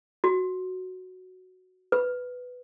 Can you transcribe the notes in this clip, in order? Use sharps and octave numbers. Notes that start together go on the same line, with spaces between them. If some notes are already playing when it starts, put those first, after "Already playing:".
F#4
B4